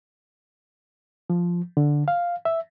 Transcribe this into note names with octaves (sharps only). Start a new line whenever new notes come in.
F3
D3
F5
E5